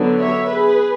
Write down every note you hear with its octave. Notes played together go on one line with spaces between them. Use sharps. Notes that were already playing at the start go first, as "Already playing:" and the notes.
Already playing: D3 F#3 B3 D4
C#5 E5
G#4 B4